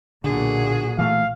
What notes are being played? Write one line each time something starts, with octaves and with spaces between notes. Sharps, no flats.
B1 A#2 D3 F#4 G#4
E3 A3 F5